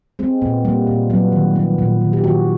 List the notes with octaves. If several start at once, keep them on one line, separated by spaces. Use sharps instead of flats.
G#3 C4
A#2 B3
G3 A#3
A#2
F#3 B3
D#3
F3 B3
A#2
D#3
G4
D#3 F#4